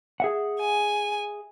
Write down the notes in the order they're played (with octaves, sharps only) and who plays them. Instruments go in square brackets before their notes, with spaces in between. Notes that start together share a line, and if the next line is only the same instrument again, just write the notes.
[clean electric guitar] G#4 E5 F#5
[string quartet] G#5